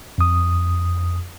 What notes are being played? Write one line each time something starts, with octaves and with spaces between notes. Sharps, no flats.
F2 D#6